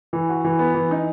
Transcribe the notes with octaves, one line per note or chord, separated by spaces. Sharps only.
E3
F#4
E3
B3
E3
D#4